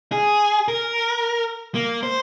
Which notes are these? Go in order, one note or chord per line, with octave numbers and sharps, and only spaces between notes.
G#4
A#4
A#3
C5